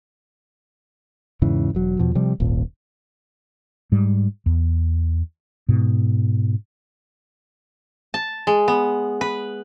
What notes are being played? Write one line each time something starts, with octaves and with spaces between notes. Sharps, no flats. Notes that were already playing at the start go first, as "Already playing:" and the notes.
E2 G#2 C#3 E3
E1 F#3
E2 B2 F3
C3 F3 G3
D#1 G#1 A#2
G#2 G3
E2
G#2 B2
A5
G#3
B3
B4